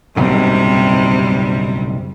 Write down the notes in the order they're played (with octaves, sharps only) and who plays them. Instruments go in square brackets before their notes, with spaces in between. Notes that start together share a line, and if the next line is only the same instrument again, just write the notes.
[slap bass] F#1 B1 G#2 [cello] C3 G3